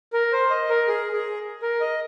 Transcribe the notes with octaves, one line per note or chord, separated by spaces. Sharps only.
A#4
C5
D#5
A#4
G#4
G#4
A#4
D#5